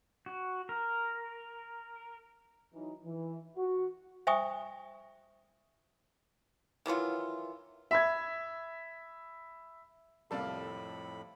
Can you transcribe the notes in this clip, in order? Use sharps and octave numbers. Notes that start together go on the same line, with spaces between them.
F#4
A#4
E3 F#3 D#4
E3
F#4
C5 E5 G5 G#5 C#6 D#6
D#3 E3 F#3 F4
E5 B5 G#6
F2 A2 C3 G3 A#3 A4 F5 B5